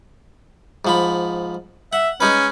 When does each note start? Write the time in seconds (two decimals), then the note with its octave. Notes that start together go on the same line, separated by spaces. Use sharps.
0.85 G#2 F3 B5
1.93 E5 F#5
2.21 G#3 C#4 D#4 B4